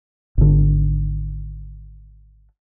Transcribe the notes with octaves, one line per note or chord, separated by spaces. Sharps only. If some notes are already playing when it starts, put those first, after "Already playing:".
G#1 D3